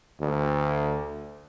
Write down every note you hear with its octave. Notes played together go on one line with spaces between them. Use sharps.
D2